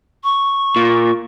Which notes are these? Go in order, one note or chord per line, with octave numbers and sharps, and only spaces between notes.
C#6
A#2